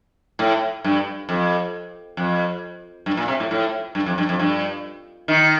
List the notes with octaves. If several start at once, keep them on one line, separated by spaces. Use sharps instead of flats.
A2
G2
F2
F2
G2
A#2
C3
A2
A2
G2
F2
G2
F2
G2
D#3